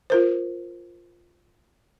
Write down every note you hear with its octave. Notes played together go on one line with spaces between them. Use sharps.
F4 A#4 C5